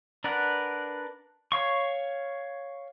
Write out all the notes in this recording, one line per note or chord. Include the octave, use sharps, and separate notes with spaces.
D4 A#4 B4 D5 F#5
C#5 F5 C#6